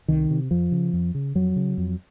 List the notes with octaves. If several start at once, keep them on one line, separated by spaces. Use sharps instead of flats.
C2 D#3
C3
F2 F3
C#3
F2
C#3
F2 F#3
C#3
F2